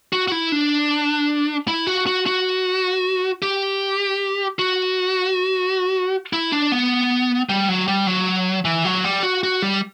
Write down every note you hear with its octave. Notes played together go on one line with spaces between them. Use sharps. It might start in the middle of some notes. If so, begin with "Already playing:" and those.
F#4
F#4
E4
D4
E4
F#4
F#4
F#4
G4
F#4
E4
D4
B3
G3
F#3
G3
F#3
E3
F#3
G3
F#4
F#4
G3